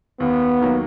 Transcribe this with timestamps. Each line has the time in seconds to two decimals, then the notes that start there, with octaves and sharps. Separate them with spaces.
0.20 D#2 B3
0.61 D#3 F#3 A#3